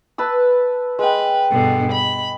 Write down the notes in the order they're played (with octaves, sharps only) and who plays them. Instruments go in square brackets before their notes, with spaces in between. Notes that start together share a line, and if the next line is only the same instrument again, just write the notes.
[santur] B4 A5 E6
[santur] G#3 G5 [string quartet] B4
[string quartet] G2 B2 D3
B5